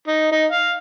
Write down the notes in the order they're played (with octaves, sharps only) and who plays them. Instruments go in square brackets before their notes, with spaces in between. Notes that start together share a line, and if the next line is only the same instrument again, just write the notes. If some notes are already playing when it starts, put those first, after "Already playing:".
[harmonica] D#4
D#4
F5